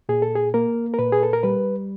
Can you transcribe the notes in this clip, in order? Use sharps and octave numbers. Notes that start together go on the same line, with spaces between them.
A#2 G#4
A4
G#4
A#3 A#4
A#4
A#2 B4
G#4
A4
A#4
G3 B4